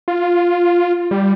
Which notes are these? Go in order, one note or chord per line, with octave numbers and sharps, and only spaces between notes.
F4
G3